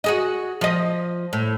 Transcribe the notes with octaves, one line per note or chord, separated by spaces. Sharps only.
F#4 G#4 D#5
F3 D#5
A2